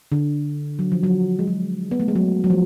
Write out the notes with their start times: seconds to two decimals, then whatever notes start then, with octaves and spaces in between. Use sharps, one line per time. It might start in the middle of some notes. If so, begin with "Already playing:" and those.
0.12 D3
0.79 F#3
0.92 F3
1.03 F#3
1.39 G#3
1.47 F#3
1.91 B3
2.00 A3
2.08 G#3
2.15 F#3
2.44 F#3
2.50 F3